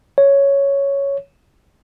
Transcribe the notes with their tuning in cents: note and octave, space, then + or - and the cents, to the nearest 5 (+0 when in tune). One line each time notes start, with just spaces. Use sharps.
C#5 +5